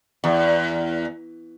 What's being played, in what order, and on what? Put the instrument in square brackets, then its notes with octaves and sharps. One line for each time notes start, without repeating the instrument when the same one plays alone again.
[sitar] E2